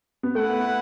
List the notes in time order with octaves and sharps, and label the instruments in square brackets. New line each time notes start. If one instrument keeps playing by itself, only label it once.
[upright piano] B3
[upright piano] A3 [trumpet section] E4 B4 F#5